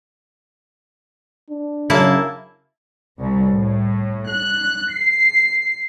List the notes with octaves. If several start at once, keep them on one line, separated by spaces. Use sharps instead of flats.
D4
F#2 C#3 A#3 E4 A5
C2
A2
F#6
C7